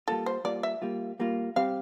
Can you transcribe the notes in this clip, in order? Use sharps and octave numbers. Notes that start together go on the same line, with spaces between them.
G3 A#3 F4 A4
C5
G3 A#3 F4 D5
E5
G3 A#3 F4
G3 A#3 F4
G3 C4 G4 F5